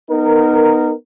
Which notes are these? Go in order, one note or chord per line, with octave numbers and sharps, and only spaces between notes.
B3 D#4 A#4